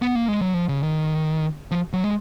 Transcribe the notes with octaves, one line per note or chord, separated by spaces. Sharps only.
B3
A#3
G#3
F#3
F3
C#3
D#3
F3
F#3
G#3